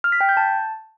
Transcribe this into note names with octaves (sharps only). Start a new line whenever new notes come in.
F6
B6
G5
G6
A5